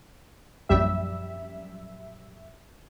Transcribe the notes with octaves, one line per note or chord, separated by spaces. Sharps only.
A#1 F#2 G3 E5